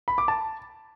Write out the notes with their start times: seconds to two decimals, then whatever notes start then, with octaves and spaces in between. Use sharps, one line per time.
0.08 B5
0.18 D6
0.28 A5